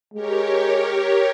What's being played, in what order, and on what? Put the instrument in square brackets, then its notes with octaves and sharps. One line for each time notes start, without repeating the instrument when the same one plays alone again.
[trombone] G#3 [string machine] G4 A#4 C#5